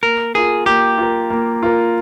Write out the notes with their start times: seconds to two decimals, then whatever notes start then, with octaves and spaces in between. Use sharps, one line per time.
0.03 A#3 A#4
0.35 F4 G#4 A#4
0.66 A#3 G4
0.98 F4 A#4
1.30 A#3
1.63 F4 A#4